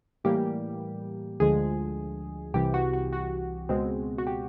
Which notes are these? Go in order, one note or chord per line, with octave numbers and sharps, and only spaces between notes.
A2 E3 G3 A#3 G4
D2 D3 F3 G#3 G#4
C2 C3 E3 G4
F#4
F#4
F#4
C#2 B2 G#3 C4
F#4
G4